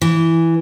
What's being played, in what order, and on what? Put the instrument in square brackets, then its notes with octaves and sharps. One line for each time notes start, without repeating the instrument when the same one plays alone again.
[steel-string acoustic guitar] E3